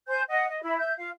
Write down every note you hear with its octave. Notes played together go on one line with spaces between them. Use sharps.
C5 G#5 G6
D#5 F#5
D#5
E4 E5 B5
E5 G6
F4 F5